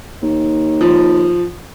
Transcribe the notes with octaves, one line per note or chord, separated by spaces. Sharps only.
D#2
F3